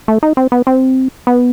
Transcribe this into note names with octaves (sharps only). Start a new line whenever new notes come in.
A3
D#4
C4
B3
C4
B3